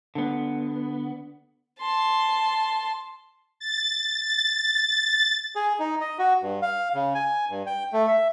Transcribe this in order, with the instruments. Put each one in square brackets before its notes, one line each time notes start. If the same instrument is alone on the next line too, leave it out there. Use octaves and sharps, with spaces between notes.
[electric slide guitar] D3 B3
[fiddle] A5 C6
[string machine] A6
A6
[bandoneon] G#4
D#4
D#5
F#4
G2
F5
C#3
G#5
G2
G5
A3
E5